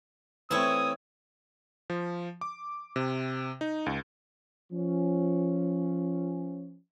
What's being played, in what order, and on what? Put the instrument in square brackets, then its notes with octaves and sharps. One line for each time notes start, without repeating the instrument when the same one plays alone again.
[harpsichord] E3 A3 C4 [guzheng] E4 C#5 [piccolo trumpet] D#6
[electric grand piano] F3
D6
C3
D#4
C#2
[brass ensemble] F3 C#4